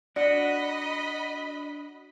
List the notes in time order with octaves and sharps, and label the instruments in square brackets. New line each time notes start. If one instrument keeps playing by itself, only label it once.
[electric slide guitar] D4 F#4 [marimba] D5 [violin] D#5 B5